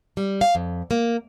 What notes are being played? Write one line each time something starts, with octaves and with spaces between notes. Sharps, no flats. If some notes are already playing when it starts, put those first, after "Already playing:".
G3
F5
F2
A#3